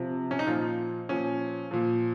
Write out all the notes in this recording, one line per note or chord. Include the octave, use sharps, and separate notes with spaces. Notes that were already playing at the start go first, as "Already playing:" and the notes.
Already playing: C3 F3
C#4
D#4
A#2 F3 F4
A#2 F3 C#4
A#2 F3